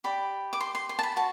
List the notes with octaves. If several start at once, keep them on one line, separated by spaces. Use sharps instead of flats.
G4 D5 B5
D6
C6
C6
C6
A5
B5
F#4 A5